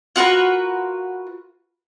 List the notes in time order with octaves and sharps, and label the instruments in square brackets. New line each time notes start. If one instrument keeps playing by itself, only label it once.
[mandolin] F4 F#4 A#4 B4